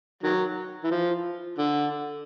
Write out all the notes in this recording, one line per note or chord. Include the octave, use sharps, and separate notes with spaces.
D#3 F#3
E3
F3
D3